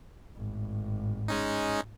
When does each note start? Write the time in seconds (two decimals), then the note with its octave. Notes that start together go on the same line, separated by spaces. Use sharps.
0.33 G#1 A2
1.28 G#3 C#4 D#4